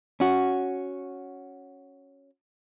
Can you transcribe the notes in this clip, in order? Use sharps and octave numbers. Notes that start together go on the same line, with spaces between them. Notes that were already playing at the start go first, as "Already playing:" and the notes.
C#4 F#4